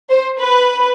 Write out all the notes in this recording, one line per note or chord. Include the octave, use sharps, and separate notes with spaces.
C5
B4